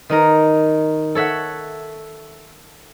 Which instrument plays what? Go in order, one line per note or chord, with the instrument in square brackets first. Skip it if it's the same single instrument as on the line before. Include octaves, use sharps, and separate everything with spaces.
[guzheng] D#3 D#4 A#4
A4 C#5 E5 F#5